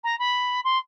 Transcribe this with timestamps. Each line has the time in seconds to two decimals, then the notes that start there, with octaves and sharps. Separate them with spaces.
0.04 A#5
0.19 B5
0.64 C6